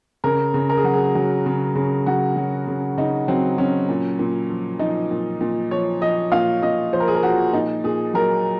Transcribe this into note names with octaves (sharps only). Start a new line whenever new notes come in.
C#3 A#4
C#3
A#4
G#4
F#3 F#4
G#4
F#3
C#3
C#3
F#3 F#4
F#3
C#3
C#3 D#4
F#3 C4
F#3 C#4
A#2
A#2
F3
F3 D#4
A#2
A#2
F3 C#5
F3 D#5
A#2 F5
A#2 D#5
F3 C5
A#4
G#4
A#4
F3 F#4
A#2 D#4
A#2 G#4
F#3 A#4